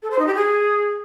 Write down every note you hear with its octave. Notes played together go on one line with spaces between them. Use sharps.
A4
C5
D#4
G4
G#4